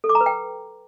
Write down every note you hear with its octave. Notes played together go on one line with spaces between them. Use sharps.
A4
D6
A#5
B4
G5